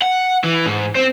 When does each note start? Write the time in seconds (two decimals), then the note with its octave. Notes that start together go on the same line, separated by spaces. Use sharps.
0.02 F#5
0.44 E3
0.66 G#2
0.95 C4